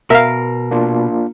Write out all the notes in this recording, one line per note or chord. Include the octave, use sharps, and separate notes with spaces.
B2 A#4 E5 F5
A#3 D4 F4